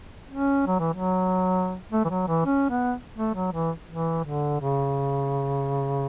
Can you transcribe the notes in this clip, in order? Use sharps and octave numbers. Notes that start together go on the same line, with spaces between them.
C#4
F#3
E3
F#3
A3
E3
F#3
E3
C#4
B3
A3
F#3
E3
E3
D3
C#3